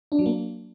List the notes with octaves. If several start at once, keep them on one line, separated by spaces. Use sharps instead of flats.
D4
F#3
A#3